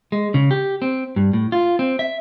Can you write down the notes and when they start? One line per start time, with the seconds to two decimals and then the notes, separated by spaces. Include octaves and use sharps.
0.12 G#3
0.34 C#3
0.51 G4
0.82 C4
1.16 G2
1.33 A2
1.52 F4
1.79 C4
1.99 E5